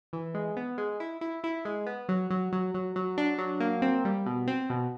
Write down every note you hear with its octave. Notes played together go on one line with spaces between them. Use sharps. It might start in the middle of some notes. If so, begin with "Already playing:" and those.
E3
G#3
B3
G#3
E4
E4
E4
G#3
B3
F#3
F#3
F#3
F#3
F#3
D4
F#3
A#3
C4
G3
B2
C4
B2